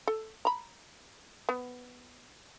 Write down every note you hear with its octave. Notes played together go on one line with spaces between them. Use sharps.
A4
A#5 B5
B3